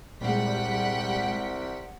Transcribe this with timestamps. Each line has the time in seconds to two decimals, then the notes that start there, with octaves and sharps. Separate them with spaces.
0.21 C2 A#2 G3 G#3 F#5 G5 B6